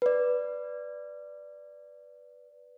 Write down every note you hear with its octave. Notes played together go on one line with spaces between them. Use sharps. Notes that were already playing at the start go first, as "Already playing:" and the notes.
B4 D5